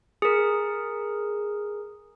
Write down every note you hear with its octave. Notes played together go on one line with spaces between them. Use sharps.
G#4 A#4